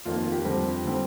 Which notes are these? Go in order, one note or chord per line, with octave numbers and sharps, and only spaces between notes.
F2 D#3 A#3 F4
F4
G4
F2 D3 G3 C4
D3 G3 C4